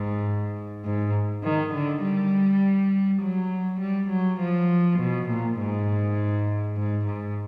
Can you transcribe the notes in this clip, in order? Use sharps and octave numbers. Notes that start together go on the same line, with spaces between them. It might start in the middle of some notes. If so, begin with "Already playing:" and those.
Already playing: G#2
G#2
D#3
D3
G3
F#3
G3
F#3
F3
B2
A#2
G#2
G#2
G#2